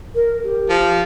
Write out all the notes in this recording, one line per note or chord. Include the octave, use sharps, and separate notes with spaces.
A#4
G4
F3